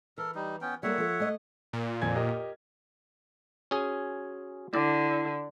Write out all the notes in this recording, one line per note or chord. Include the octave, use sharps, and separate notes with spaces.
E3 A4 A#4
G3 D#4
B3 C#4 G5
G3 A#3 A4 C#5 E5 F#5
F3 A4
A3 D#5
A#2
F2 G#5 G#6
G4 A#4 D#5
C#4 F#4 G#4 G#5
D3 E4 D5 A#6